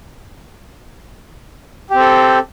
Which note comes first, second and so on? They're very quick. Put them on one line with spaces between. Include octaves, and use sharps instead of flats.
G4 C4 A4